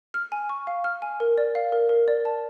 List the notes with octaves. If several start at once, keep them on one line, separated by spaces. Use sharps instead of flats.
F6
G#5
C#6
F5
F6
G#5
A#4
D5
F5
A#4
A#4
D5
A5